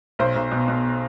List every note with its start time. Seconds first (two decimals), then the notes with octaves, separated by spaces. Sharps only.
0.19 B1 C5
0.36 B1
0.51 B2
0.68 B2